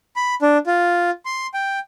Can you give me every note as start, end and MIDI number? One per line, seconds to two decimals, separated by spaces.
0.16 0.35 83
0.42 0.58 62
0.67 1.10 65
1.25 1.47 84
1.54 1.79 79